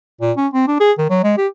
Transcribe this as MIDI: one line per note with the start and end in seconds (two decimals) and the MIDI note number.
0.21 0.32 46
0.37 0.48 61
0.54 0.67 60
0.68 0.77 62
0.80 0.92 68
0.98 1.06 51
1.10 1.20 54
1.24 1.34 56
1.38 1.48 67